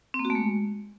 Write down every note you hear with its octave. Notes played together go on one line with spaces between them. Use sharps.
C4
A#3
F#4
A3
G#3